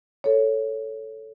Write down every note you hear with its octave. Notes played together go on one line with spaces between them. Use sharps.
A4 C#5